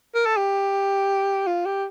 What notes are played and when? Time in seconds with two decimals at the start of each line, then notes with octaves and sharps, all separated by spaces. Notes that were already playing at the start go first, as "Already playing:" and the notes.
0.15 A#4
0.26 A4
0.37 G4
1.47 F4
1.66 G4